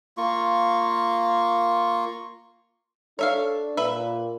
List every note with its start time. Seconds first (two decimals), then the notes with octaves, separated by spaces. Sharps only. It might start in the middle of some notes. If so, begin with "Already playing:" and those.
0.17 A#3 F4 C#6
3.19 D4 A4 C#5 E5 F5
3.77 A#2 B4 E5